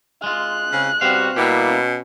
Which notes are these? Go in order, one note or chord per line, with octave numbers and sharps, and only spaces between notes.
G#3 F4 F#6
C#3 C4
B2 G3 C4 F#4 F5
B2 G3 A#3 E4 G4
C#4